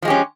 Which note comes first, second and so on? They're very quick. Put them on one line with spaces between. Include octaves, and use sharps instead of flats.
F3 G#3 G4 C#4